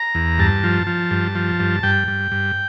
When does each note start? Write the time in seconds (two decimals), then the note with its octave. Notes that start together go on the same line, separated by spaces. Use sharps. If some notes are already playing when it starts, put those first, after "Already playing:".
Already playing: A#5
0.15 E2
0.39 G2 A5
0.64 F3
0.87 F3
1.11 G2
1.35 F3
1.60 G2
1.83 G2 G5
2.08 G2
2.32 G2